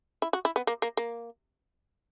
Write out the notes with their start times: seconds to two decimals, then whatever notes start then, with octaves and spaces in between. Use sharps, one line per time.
0.22 E4
0.33 F#4
0.45 E4
0.56 B3
0.67 A#3
0.82 A#3
0.97 A#3